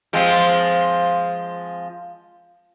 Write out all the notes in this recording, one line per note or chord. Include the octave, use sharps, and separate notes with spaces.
F3 G#3 C4